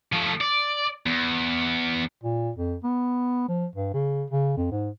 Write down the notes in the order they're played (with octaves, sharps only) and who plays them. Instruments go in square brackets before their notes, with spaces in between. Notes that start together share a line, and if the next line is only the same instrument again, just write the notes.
[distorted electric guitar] F3 A3
D5
E2
[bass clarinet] A#2
F2
B3
F3
G2
C#3
C#3
F2
G#2